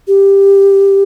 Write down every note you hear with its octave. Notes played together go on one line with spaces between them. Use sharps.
G4